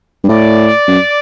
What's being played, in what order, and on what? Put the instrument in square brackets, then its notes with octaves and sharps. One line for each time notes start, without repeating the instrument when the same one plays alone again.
[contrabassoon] G2
[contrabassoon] A2 [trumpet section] D5
[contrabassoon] F#2